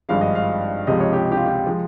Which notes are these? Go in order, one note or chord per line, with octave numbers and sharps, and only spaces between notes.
G#1 G2 F3 G#3 F5
D#5
F5
C#2 C3 F3 G#3 D#5
C#5
G4
G4
F4
G4
F3 G#3